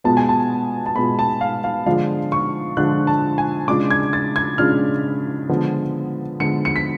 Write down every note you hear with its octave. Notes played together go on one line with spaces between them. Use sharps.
B2 G#3 B3 F4 A5
G#5
A5
A5
B2 G#3 B3 F4 B5
A5
F5
F5
D3 F3 G#3 D4 F4 F5
C#6
D3 F3 G#3 D4 F4 F#6
A5
G#5
C#3 G#3 D4 F4 D6
G#6
A6
G#6
C#3 G#3 D4 F4 F6
D3 F3 G#3 B3
D3 F3 G#3 B3 C#7
C#7
B6